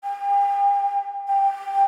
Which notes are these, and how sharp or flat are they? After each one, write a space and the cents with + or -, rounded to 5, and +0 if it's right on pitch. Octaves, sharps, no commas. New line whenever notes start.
G5 +40
G5 +5